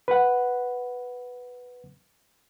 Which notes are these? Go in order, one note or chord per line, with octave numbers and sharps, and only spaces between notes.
B4 F#5